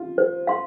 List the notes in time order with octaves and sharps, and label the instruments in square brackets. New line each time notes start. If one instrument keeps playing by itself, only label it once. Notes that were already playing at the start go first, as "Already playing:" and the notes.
Already playing: [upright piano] F4
[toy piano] C5
F5 C6